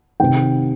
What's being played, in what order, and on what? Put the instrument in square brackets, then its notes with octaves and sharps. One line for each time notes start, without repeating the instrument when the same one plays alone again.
[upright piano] C3 D#3 G5